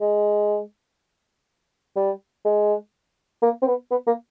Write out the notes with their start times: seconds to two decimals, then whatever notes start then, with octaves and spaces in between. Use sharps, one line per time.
0.01 G#3
1.96 G3
2.45 G#3
3.42 A#3
3.62 C4
3.67 B3
3.91 B3
4.07 A#3